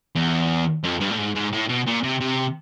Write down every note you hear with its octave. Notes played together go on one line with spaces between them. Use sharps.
E2
F2
G2
A2
G#2
G#2
A2
B2
A#2
C3
C3